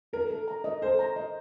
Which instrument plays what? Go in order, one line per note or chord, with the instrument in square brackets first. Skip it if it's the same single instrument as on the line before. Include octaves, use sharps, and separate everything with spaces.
[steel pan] A4 [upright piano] A#4
[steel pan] A4
A#5
D#5
[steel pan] A4 [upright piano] C5
[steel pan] A#5
D#5